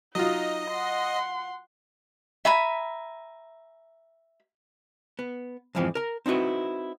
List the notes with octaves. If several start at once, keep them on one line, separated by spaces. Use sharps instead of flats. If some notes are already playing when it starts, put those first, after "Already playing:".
F#3 D#4 F4 D#5
F#5 C6
E5 G#5 A#5 B5
B3
F2 G#2 E3 F3 C4
A#4 A#5
C4 D#4 E4 F#4 B4